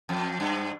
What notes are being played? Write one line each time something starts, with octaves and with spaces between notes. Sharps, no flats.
F2
G2